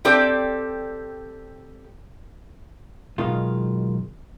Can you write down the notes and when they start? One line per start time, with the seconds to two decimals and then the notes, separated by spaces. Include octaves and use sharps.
0.05 C4 G4 A4 D5
3.18 F#2 B2 D#3 G#3 F4